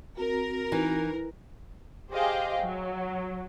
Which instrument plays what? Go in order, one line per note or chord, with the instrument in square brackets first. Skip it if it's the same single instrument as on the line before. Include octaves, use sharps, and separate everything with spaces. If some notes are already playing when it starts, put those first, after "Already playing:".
[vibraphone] C4 F#4 [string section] A#4
[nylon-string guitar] E3 [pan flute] D#4
[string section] G4 G#4 C5 D#5 F5 G5
F#3